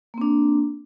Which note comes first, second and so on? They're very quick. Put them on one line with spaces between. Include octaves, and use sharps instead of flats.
A#3 C4 D4